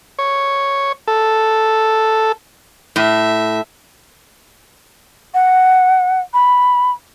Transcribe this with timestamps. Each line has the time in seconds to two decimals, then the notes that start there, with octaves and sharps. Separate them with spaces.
0.19 C#5
1.08 A4
2.96 A2 E5
5.34 F#5
6.34 B5